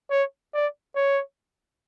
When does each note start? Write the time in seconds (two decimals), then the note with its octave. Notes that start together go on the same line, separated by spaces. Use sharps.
0.10 C#5
0.54 D5
0.96 C#5